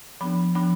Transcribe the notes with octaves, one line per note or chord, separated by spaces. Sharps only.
F3 B3 D4 B5
F3 B3 D4 B5